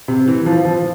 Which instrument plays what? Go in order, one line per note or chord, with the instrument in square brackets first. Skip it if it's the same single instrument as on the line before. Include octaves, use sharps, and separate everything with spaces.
[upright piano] C3
E3
F3
F3